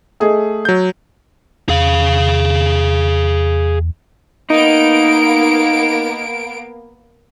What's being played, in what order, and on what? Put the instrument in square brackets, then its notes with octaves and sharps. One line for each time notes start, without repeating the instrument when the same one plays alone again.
[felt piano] A3 G#4 D#5
[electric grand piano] F#3 G6
[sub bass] E2 [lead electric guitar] G#4 F5
[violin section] A#3 B3 D7 [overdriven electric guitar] D#4